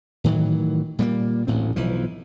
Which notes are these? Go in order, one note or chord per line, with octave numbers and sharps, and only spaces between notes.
A2 D#3 E3 F#3
A#2 G3 A3 A#3
A1 D2 A2 C4
B1 E3 F3